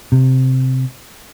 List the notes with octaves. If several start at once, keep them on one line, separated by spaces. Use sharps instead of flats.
C3